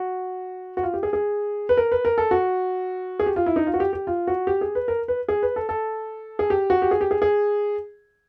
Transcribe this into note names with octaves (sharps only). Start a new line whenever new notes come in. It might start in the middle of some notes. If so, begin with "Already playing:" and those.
Already playing: F#4
F#4
F4
G4
G#4
G#4
B4
A#4
B4
A#4
A4
F#4
G#4
G4
F4
E4
D#4
F4
F#4
G4
G4
F4
F#4
G4
G#4
B4
A#4
B4
G#4
B4
A4
A4
G#4
G4
F#4
G4
G#4
G4
G#4
G#4